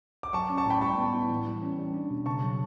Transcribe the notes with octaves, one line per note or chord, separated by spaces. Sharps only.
D6
F#3 A5 C#6
C#4
A5 C#6
A2 G5 B5
G3 A5 C#6
B3
E4
E3
G3
C#4
G3
D4
B2
C#3 A5 C#6
F#3